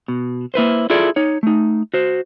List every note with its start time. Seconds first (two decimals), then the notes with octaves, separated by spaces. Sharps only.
0.08 B2
0.54 A#3 E4 B4 C5
0.90 E4 F4 G#4 A4 D5
1.16 D#4 C#5
1.43 A3 D#4
1.94 F#4 C5